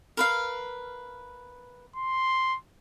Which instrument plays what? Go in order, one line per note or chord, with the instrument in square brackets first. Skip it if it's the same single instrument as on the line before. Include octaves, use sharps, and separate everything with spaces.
[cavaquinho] A#4 B4 F5
[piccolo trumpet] C6